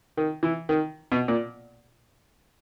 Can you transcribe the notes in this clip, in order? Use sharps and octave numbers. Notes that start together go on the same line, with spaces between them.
D#3
E3
D#3
B2
A#2